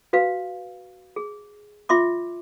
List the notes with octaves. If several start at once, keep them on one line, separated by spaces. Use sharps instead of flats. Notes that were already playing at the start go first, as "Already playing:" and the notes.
F#4 B4 F5
G#4
F4 E5 C6 D6